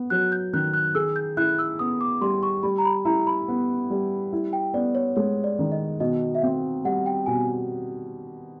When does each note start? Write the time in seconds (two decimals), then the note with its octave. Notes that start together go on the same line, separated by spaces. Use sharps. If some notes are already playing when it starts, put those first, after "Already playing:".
Already playing: B3
0.10 F#3 F#6
0.32 G6
0.53 D#3 F#6
0.74 F#6
0.95 G#4 E6
1.16 G6
1.37 E4 F#6
1.59 E6
1.79 B3 D#6
2.01 D6
2.21 G3 C6
2.43 C#6
2.63 G3 B5
2.78 A#5
2.85 B5
3.05 E4 A#5
3.27 B5
3.48 B3
3.90 G3
4.33 E4
4.53 G5
4.74 B3 D5
4.95 C#5
5.16 G#3 C#5
5.44 D5
5.59 D#3
5.72 D#5
6.00 B2 D#5
6.35 E5
6.42 C4 F5
6.85 G3 F#5
7.06 G5
7.26 B2 G#5